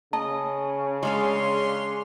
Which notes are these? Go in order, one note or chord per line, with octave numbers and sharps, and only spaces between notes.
C#3 D#5 A5
G#3 C#4 D4 A4 F5 C6